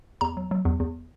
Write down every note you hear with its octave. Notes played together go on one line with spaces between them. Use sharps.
E2 A#5
F#3
F#3
E2
E2